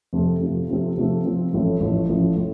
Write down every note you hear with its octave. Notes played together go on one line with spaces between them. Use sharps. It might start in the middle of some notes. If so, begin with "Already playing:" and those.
F2 C3 A3
C3 F3 A3 C4
C3 F3 A3 C4
C3 F3 A3 C4
C3 F3 A3 C4
A1 A2 F3 A3
A1 A2 F3 A3
A1 A2 F3 A3
A2